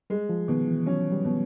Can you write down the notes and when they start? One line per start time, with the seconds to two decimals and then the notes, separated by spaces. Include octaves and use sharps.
0.10 G3 G#3
0.29 F3
0.48 B2 D#3
0.67 E3
0.86 F#3 C#4
1.12 G3
1.24 B2